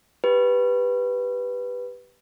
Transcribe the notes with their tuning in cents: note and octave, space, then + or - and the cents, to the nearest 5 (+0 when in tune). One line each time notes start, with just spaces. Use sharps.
G4 +0 B4 +0